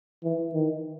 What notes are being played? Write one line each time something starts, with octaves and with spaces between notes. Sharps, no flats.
E3
D#3